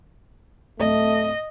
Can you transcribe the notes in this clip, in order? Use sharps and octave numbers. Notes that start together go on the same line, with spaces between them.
D1 A3 C4 D#5